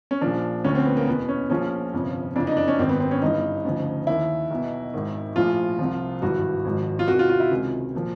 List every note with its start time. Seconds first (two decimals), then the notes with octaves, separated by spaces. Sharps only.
0.11 C#4
0.21 A#1 A#2 F3 D4
0.64 D2 D3 F3 C#4
0.75 C4
0.86 B3
0.97 A#3
1.07 E2 B2 B3
1.29 C#4
1.50 A#1 A#2 F3 C#4
1.93 G1 F2 C3 F3
2.35 F#1 F2 C#3 E3 D4
2.47 D#4
2.57 D4
2.68 C#4
2.79 G#1 F#2 D#3 C4
2.89 B3
3.00 C4
3.11 C#4
3.22 G1 G2 E3 D#4
3.65 D2 C#3 F3
4.07 D#2 D#3 E4
4.51 B1 B2
4.93 G#1 G#2 D#3
5.36 A#1 A2 F3 F4
5.79 C2 C3 F3
6.22 G#1 G2 E3 F#4
6.65 G#1 G#2 F3
6.99 F4
7.08 E2 C3 D#3 F#4
7.19 F4
7.29 F4
7.40 E4
7.51 C#2 C3 D#3
7.95 A#2 F3